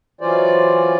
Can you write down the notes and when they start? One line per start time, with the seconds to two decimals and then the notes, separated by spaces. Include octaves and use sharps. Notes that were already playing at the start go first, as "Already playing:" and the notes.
0.21 E3 F#3 C#4 F4 C5 D5